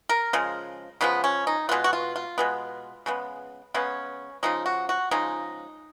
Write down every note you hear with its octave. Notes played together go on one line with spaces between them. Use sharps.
A#4
C#3 F3 G#3
C#3 F3 G#3 B3
C#4
D#4
B2 G#3 B3 F4
F#4
F4
F4
B2 G#3 B3
C#3 G#3 B3
C#3 G#3 B3 C#4
C#3 F3 G#3 D#4
F#4
F#4
C#3 F3 G#3 D#4